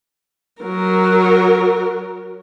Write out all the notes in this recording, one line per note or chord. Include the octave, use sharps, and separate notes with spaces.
F#3 A#4